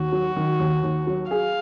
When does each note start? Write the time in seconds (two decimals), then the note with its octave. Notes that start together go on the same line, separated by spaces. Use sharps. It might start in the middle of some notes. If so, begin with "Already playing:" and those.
Already playing: D#2 F#4
0.12 F#3
0.36 D#3
0.59 D#2
0.83 D#2
1.07 F#3
1.31 G#4 F5